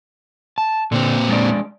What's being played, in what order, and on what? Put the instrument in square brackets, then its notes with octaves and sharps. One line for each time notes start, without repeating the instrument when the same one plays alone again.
[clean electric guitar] A5
[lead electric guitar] A#2 C4 [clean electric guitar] D3
[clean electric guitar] G#3 D4 D5